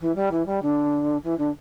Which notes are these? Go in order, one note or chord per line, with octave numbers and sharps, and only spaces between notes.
E3
G3
E3
G3
D3
E3
D3